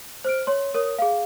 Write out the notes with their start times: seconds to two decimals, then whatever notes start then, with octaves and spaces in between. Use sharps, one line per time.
0.24 C5 F6 D7
0.47 C#5 C6
0.74 A#4 C#5 D#6
0.98 G#4 F5